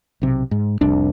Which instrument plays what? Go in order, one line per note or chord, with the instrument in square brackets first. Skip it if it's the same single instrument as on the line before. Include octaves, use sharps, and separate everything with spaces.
[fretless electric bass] B1 C3
G#2
F1 C2 D4